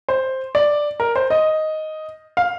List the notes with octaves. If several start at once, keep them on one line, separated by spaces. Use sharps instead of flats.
C5
D5
A#4
C5
D#5
F5